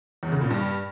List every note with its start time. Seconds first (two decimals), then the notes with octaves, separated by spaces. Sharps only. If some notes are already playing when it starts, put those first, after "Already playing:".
0.23 E2
0.32 C#3
0.41 A#2
0.50 G2